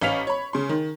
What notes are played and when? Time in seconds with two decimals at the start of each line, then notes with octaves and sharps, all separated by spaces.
0.02 A1 C#4 F5 B6 F7
0.27 C#5 B5
0.53 C#3 C6
0.69 D#3